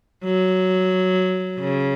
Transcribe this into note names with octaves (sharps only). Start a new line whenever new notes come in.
F#3
C#3